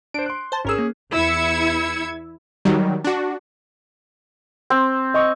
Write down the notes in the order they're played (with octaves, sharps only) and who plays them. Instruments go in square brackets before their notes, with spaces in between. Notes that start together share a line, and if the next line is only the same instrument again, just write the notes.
[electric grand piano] D4 C5 [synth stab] D7
[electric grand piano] C6 F#6
[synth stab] C5 A5
[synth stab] G#1 A#4 E6 [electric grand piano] C#4 G#4
[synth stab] A#3
[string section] E2 E4 E6 G#6 C#7
[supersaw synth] D#3 F#3 G3
D4 F#4
[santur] C4
[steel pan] D#5 C#6